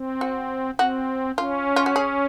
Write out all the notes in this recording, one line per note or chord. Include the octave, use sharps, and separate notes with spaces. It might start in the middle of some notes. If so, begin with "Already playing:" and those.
Already playing: C4
F#4
C4 F#4
C#4 F4
F4
F#4
G#4